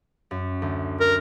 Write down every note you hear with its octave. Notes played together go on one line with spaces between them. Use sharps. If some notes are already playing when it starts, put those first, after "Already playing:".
F#2
D2
A#4